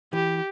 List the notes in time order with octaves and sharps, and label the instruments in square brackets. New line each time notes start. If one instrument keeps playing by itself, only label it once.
[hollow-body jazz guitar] E3 [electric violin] G4